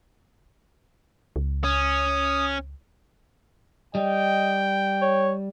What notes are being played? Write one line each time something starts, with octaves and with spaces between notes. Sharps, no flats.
C#2
C#4 D#6
G3 D#5 G5
C#5